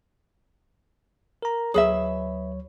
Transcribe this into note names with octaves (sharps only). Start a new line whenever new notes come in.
A#4 A#5
D2 F#3 G#4 B4 C#5 E5